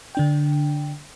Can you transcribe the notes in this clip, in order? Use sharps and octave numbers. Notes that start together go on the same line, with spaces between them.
D3 D4 G5